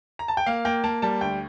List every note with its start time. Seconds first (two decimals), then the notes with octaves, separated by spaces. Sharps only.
0.19 A#5
0.28 A5
0.37 G5
0.46 A#3 F5
0.65 A#3 G5
0.84 A#3 A5
1.02 G3 A5
1.21 D2 G5